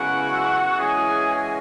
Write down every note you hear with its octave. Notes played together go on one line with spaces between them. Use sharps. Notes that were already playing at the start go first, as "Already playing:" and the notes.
Already playing: F#2 C#3 G#3 B3 E4 F#4 F#5
E3 G#3 C#4 E4 G#4 G#5
F#4